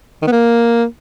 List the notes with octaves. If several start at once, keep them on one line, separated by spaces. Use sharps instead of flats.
D#3
B3
A#3